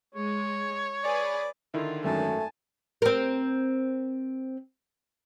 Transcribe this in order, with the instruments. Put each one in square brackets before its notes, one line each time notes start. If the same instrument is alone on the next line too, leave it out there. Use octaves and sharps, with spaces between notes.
[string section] G#3 [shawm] C#5
[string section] G#4 B4 [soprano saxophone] D5
[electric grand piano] D3 D#3 [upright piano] E4 [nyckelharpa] F4
[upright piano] G#1 F#2 F#3 [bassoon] A3 [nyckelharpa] G#5 A5
[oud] C4 A#4